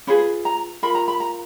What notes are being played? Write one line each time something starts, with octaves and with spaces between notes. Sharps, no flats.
C#4 F4 G#4 B4 B5
A#5
F4 A#4 B5
A#5
B5
A#5